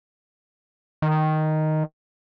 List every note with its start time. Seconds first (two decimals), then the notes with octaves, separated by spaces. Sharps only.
1.02 D#3